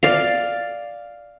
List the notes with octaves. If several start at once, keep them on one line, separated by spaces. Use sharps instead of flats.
D5 F5